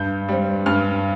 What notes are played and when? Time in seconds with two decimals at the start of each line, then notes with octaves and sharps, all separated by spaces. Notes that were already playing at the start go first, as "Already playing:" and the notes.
Already playing: G2 G6
0.29 G3 C4
0.66 G2 F6